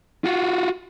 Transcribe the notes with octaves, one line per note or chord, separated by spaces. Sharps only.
F4 F#4